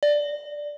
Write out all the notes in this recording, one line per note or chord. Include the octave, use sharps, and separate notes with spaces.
D5